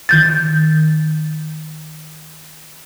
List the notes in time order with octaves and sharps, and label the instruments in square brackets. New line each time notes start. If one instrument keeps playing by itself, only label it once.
[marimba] D#3 G6 A6